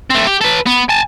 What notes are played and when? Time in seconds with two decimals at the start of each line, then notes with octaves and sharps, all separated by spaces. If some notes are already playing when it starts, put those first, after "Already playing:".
0.10 A3 C4
0.27 G4
0.41 A4 B4
0.66 B3
0.89 G#5 A5